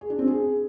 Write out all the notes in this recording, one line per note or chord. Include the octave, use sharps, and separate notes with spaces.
G#4
D4
C4
G#4